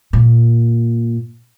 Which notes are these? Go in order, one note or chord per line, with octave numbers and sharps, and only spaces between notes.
A#2